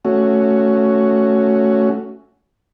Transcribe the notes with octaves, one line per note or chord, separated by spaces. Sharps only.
A3 C#4 F#4